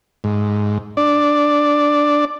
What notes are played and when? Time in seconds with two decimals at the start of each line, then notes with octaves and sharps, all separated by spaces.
0.24 G#2
0.97 D4 D5